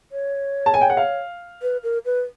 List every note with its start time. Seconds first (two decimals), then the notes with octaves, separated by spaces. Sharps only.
0.12 C#5
0.66 A5
0.74 G#5
0.81 G5
0.90 F#5
0.97 F5
1.62 B4
1.83 A#4
2.05 B4